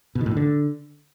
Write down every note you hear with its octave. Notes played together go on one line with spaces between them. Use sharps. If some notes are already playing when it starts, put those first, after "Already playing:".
B2
D#3
A2
D#3
D3